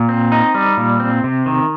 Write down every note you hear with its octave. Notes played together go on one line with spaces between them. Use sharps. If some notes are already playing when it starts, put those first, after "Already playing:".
Already playing: A#2
C4
D#4
G3
A#2
C4
C3
D#3